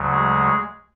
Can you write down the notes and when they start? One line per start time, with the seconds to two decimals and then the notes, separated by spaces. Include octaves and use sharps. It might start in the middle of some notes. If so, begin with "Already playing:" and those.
Already playing: D2 C#3 F#3
0.11 G#3 G#4